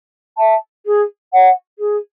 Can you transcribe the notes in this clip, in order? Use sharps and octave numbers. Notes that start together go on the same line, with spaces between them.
E5 A5
G#4
C#5 F#5
G#4